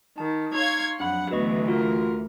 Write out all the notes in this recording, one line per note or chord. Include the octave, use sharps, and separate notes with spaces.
D#3 A5
D#4 C#5 F5 C6 C#6 G#6
F2 F#3 D4 F#5 B5
D2 E3 F#3 B3 B4 D#5 C#6
F4 F#4 A#4